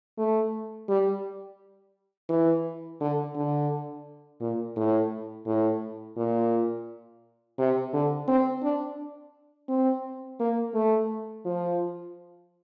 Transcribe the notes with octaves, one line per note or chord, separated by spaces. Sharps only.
A3
G3
E3
D3
D3
A#2
A2
A2
A#2
C3
D3
C4
D4
C4
A#3
A3
F3